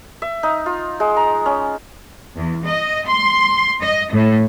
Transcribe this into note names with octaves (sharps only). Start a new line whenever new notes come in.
E5
D#4
F4
G#3
A#5
C#4
E2
D#5
C6
D#5
A2